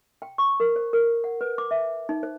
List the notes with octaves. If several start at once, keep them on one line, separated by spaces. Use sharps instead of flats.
G5
C#6
A#4
C5
A#4
F#5
B4
D6
E5
D#4
C5